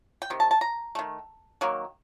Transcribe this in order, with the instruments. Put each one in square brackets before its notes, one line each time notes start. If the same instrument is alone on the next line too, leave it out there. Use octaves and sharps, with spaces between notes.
[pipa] G5
C3 D#3
A5
A5
A#5
D#3 A3
D#3 F#3 A#3